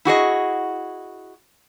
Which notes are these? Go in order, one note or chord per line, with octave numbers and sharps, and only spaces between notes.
E4 F#4 G#4 D#5